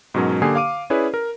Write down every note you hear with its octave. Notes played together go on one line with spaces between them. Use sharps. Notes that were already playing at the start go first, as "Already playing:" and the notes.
G#2 B2 F#3 C#4 A#4
D3 A#3 G4 G#5 D#6 C7
F5 D6 D#7
C#4 E4 G#4 B4 C#5 D5
A#4